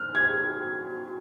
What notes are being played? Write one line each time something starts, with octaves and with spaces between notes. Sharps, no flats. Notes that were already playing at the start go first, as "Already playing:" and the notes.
Already playing: F6 F#6
G4 G#6
G#4
G4
F#4